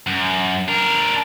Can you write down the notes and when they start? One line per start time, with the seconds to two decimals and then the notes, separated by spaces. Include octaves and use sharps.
0.07 F#2
0.68 D4 A#4